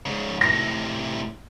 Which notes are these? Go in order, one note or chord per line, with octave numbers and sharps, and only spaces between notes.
G#2 C#3
A2 C3 A#6